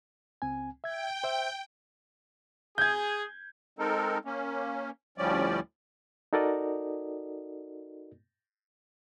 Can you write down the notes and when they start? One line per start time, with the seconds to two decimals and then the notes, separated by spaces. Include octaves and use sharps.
0.42 C#2 C4 G#5
0.84 E5 G5 G#6
1.24 C5 E5
2.78 G#4 G6 G#6
3.79 G#3 C4 D#4 A4 A#4
4.25 A#3 C#4
5.18 D2 A2 F3 G3 C#4 D5
6.33 D#4 F#4 A4 A#4 D5 D#5